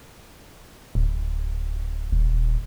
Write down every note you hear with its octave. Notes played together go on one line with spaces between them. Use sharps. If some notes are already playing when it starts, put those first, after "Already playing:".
D1
D#1